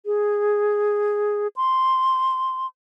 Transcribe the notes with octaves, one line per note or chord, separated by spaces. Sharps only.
G#4
C6